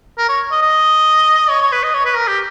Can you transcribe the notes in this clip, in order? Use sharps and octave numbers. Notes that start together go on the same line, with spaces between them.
A#4
C#5
D#5
D#5
C#5
C#5
B4
D#5
C#5
B4
A#4
G4